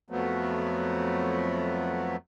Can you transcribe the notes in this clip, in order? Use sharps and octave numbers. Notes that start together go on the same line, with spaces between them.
F2 F3 F#3 A3 B3